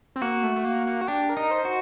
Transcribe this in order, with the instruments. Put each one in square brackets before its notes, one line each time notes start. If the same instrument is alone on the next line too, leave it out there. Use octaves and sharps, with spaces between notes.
[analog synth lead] C4
[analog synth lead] A#3 [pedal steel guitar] F#4
[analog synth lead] A3
A3
A#3
A#3
F#4
[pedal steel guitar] D4 [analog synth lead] G4
[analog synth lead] A#4
[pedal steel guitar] D#4
[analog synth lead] C5
[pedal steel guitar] F#4